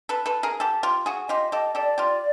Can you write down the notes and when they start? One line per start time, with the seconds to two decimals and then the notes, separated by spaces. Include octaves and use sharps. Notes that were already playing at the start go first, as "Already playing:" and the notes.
0.09 A4 B4
0.26 A4 B4
0.43 G#4 A#4
0.60 G4 A4
0.83 F4 G4
1.06 F#4 G#4
1.29 F4 G4 D#5
1.52 G4 A4 D#5
1.75 G4 A4 D5
1.98 F4 G4